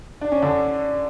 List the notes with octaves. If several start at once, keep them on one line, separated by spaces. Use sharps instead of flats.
D4
C#4
D3 D4